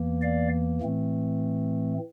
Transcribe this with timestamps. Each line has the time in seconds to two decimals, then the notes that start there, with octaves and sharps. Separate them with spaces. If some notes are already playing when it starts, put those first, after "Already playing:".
Already playing: E2 E3 A#3
0.21 D5 F5
0.81 A2 E3 A3 C4